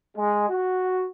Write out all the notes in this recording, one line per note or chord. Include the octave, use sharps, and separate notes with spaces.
G#3
F#4